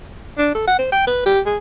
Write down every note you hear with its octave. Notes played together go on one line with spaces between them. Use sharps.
D4
A4
F#5
C5
G5
B4
G4
G#4